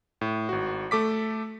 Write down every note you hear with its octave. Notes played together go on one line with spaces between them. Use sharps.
A2
G#1 F#4
A3 A4 D6 B6